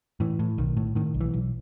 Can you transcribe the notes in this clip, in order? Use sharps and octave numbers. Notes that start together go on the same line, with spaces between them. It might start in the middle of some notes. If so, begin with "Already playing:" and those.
A2 E3
A2
B1 D#3
A2
A2 D#3
B1
E3
B1